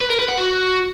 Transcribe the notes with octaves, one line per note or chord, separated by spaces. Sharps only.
B4
A#4
B4
F#5
F#4